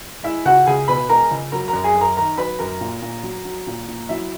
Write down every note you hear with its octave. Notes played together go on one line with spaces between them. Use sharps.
G#3 E4 E5
C#2 F#4 F#5
C#2 G#4 G#5
B2 B4 B5
G#3 A#4 A#5
C#2
F#3 A#4 A#5
A#4 A#5
F#2
G#4 G#5
F#2
A#4 A#5
D#3 A#4 A#5
F#3 B4 B5
F#2 A#4 A#5
A#2
A#2
F#3
F#3
A#2
A#2
F#3 E4 E5